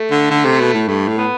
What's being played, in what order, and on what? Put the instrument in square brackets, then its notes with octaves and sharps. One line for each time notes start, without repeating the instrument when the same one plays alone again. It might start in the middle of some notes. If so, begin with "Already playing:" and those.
Already playing: [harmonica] A3
[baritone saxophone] D3
D3
C3
B2
A2
[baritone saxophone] G2 [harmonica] A3
[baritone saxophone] A2
[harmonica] B3